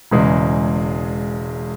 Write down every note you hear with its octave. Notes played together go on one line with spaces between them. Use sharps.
E1 E2 C#3 G#3